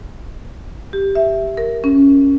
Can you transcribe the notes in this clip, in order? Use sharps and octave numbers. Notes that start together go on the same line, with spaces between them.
G4
E5
A#4
C#4